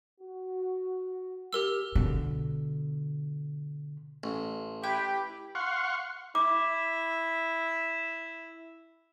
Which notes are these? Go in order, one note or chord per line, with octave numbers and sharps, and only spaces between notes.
F#4
G4 A#4 E6
B2 D3
A1
E4 G4 B4 G5
F5 F#5 C6 C#6
E4 D6